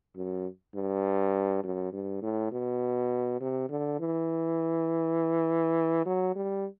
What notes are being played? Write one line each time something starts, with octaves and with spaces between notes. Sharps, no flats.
F#2
G2
F#2
G2
A2
B2
C3
D3
E3
F#3
G3